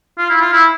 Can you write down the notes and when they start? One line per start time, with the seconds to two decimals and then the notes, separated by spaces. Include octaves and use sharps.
0.19 F4
0.30 E4
0.41 F4
0.53 E4